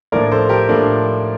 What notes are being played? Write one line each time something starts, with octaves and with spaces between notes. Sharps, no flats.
A2 F3 A#3 D4 A#4 D5
A4 C5
G4 A#4
A2 F3 A#3 D4 F4 A4